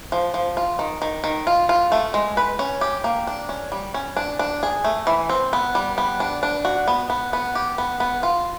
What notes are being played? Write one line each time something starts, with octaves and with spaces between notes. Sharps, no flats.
F3
F3
F4
D#3
D#3
D#3
F4
F4
A3
G#3
B4
C#4
G4
A#3
D4
C#4
G3
C#4
D4
D4
G#4
A3
E3
C4
B3
G3
B3
D4
D4
F#4
B3
B3
B3
G4
B3
B3
F4